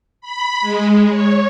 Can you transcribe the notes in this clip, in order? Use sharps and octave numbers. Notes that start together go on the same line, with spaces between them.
B5
G#3
C#5